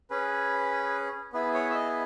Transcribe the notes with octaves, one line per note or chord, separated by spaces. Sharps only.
C#4 G#4 B4
B3 E4 G#4 B4
C#5
E5
D#5